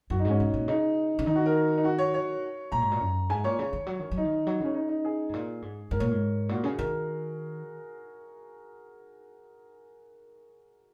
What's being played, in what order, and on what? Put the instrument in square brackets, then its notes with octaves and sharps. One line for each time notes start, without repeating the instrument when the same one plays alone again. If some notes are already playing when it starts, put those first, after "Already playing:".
[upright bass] F#2 [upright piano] F#4
[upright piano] D#4
[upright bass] G#2 [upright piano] C#4
[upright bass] C#3
G#2
A#2
[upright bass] C#3 [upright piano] D#4
[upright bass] C#3
[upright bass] D#3 [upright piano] D#4
[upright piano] F#4
A#4
D#4
F#4
C#5
C#5
[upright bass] A#2 [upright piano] A#5
[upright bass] G#2
A#2
F#2
[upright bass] G#2 [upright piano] G#5
[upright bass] A#2 [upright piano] C#5
[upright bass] C#3
D#3
F#3
D#3
F#3
[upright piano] D#4
[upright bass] D#3
F#3
[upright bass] C#3 [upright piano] C#4
[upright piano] D#4
D#4
G#4
[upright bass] G#2
A#2
G#2
[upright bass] G#2 [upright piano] A#4
[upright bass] A#2 [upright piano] C#5
[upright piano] A#4
[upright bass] G#2
[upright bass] A#2 [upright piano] F#4
[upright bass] C#3 [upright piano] G#4
[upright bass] D#3 [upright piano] A#4